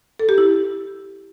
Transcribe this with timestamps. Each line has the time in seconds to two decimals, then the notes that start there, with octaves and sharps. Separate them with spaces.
0.19 A4
0.29 G4
0.38 E4